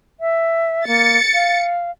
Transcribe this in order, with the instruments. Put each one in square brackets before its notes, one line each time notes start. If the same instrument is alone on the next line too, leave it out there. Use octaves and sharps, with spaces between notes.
[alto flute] E5
[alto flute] A#3 [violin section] A6 C#7
[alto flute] F5